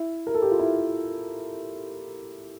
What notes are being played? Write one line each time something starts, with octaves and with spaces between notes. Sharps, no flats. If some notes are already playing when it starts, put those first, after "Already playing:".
Already playing: E4
A#4
A4
G4
F4
E4